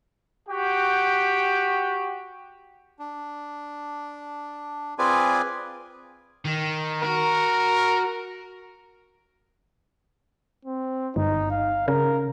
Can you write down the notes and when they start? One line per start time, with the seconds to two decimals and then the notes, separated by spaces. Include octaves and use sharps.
0.49 F#4 G4 G5
2.99 D4
4.98 C4 F4 G#4 B4 D5 G#5
6.45 D#3
7.03 F#4 A#4
10.65 C4
11.16 G1 D#4
11.51 F5
11.88 C#3 A#4